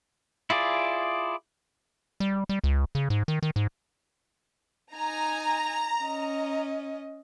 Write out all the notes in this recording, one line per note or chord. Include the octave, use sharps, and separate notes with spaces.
E4 F4 G#4 D5
G3
G3
C#2
C#3
G#2
D#3
D#3
G#2
D#4 G#5 A#5
C#4 D#5